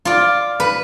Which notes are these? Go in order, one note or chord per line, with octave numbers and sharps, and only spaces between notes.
F4 D5
B4